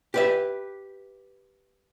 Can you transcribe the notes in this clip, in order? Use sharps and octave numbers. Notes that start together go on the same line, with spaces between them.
G4 B4 E5